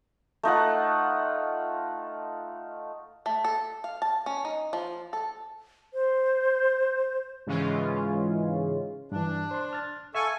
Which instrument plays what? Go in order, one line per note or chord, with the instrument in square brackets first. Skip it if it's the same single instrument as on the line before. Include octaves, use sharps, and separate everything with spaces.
[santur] A3 D#4 F4 F#5
[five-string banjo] A3
A4
F5
A5
C#4
D#4
F3
A4
[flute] C5
[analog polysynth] G#2 C#3 E3 G#3 C#4 F4
[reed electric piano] G2 E3 [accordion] D4
[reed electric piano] C5 C6
F6 A6
[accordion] A4 G#5 C#6 [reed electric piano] E5 F5